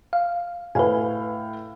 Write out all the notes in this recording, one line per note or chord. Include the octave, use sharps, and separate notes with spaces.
F5
A2 B4 F5 G#5